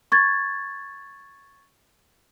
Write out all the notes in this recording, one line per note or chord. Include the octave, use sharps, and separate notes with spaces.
C#6 G#6 A6